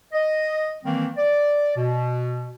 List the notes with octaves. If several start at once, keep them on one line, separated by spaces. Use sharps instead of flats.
D#5
D#3 E3 G3 A#3 C4
D5
B2